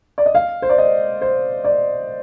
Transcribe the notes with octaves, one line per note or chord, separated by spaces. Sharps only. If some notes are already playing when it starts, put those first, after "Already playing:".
D5
D#5
F5
C5
D5
D#5
C5
D5